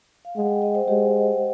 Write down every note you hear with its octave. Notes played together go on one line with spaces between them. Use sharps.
F5
G#3 F#5
G5
D#5
C5
G#3 G4